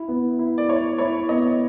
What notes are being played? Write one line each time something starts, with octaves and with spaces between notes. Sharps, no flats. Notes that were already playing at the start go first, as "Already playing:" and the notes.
Already playing: E4
B3
E4
D5
E4 C#5
E4 C#5
B3 D#5